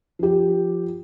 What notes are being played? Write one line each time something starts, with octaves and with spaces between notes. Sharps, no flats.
F3 G4